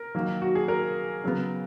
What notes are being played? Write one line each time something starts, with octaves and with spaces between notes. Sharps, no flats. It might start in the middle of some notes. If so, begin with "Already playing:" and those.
Already playing: A#4
D#3 F#3 A#3
F#4
G#4
A#4
C#3 F#3 B3